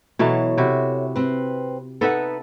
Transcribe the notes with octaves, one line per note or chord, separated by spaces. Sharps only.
B2 E3 F#3 A4 C#5 A5
C3 E4 F#4
C4 B4
B3 D#4 A4 B4 E5 F#5